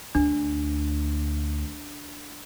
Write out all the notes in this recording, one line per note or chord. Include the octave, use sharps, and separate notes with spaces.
D2 D4